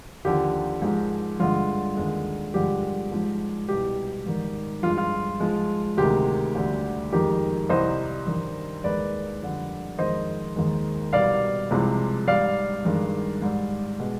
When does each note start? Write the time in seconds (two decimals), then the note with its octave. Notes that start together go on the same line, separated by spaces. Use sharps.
0.25 D#2 D3 F3 G4
0.82 G#2 F3 G#3
1.40 G2 D3 G#3 F4
1.97 D#2 D3 G#3
2.54 G2 D3 F3 G#3 G4
3.12 G#2 F3 G#3
3.68 C2 B2 G3 G4
4.26 G#2 D#3 G3
4.83 G2 F3 G#3 F4
4.98 F4
5.40 G#2 F3 G#3
5.97 D2 C3 D#3 G#3 G4
6.55 D2 D3 G3
7.12 F2 D#3 G#3 G4
7.69 C2 C3 G3 C5 D#5
8.27 G2 D#3 G3
8.84 D#2 D#3 G#3 B4 D5
9.41 F2 D3 G3
9.98 F2 D#3 G#3 C5 D#5
10.56 D#2 D#3 G#3
11.12 C2 B2 G3 D5 F5
11.70 C2 C3 F3 G#3
12.27 G#2 G3 D5 F5
12.85 G2 D#3 G#3
13.42 G#2 G3
13.99 B2 G#3